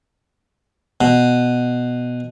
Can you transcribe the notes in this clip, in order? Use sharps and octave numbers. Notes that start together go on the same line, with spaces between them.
B2